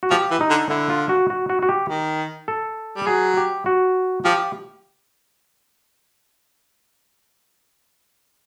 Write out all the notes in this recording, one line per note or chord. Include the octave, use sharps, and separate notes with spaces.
F#4
F3 G4
E3
D#4
D3
D3 E4
F4
F#4
F#4
F#4
F#4
G4
D#3
A4
G3
F#3 G#4
G4
F#4
F3 G4